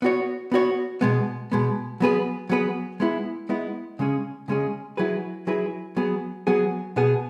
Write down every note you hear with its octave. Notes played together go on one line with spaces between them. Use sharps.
B3 F#4 C#5
B3 F#4 C#5
B2 G#3 B3
B2 G#3 B3
F#3 B3 G#4 B4
F#3 B3 G#4 B4
G#3 B3 E4
G#3 B3 E4
C#3 G#3 C#4 G#4
C#3 G#3 C#4 G#4
F#3 E4 G#4 B4
F#3 E4 G#4 B4
F#3 B3 G#4
F#3 B3 G#4
B2 B3 G#4